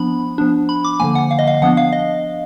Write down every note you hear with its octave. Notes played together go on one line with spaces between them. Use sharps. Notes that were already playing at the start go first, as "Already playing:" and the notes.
Already playing: F3 B3 D4 B5
F3 B3 D4
B5
D6
D3 F3 A#3 G#5
F#5
F5
D#5
F5
F3 B3 D4 F#5
F5
D#5